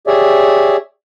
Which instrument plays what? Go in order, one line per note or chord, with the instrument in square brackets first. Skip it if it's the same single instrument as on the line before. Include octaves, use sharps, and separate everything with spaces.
[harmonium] G4 G#4 C#5 D5 E5